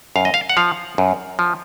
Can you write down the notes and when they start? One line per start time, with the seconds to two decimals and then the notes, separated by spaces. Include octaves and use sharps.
0.16 F#2 F5
0.25 D#5
0.34 F5
0.49 F#5
0.57 F3 F5
0.98 F#2
1.39 F3